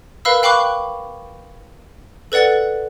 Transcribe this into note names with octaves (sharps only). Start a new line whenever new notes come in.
A#4 B4 F5 B5 E6
F5 G5 B5 C#6 D6 F#6
A4 B4 D5 F#5 A6